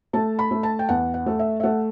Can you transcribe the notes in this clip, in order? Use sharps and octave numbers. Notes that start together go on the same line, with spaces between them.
A3 A5
B5
A3
A5
G5
E2 F#5
F#5
A3
E5
E5
A3 F#5